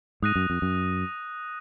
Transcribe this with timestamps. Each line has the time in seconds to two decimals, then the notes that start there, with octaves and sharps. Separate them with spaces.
0.22 G#2 D#6 F#6 A#6 D#7
0.36 F#2
0.50 F2
0.62 F#2